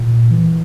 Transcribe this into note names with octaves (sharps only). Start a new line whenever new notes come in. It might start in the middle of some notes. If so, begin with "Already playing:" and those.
Already playing: A#2
E3